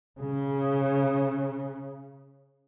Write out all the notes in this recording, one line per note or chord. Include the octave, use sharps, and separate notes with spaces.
C#3